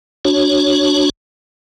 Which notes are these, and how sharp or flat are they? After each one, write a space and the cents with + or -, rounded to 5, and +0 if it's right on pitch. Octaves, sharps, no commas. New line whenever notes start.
D4 +0 F#4 +0 C#5 +0